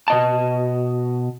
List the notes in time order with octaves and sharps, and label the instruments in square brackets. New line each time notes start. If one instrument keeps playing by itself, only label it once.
[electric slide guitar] B2 D#5 A5